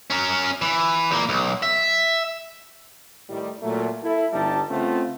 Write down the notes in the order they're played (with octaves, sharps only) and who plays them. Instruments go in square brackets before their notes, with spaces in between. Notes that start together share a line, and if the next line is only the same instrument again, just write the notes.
[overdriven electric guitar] C#4 A#4
E3
E2 A#3
B1
E5
[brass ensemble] A2 D#3 G3
A#2 F#3 A3
E4 A4
G1 G3 D#4 A5
C#3 A3 B3 C4 F4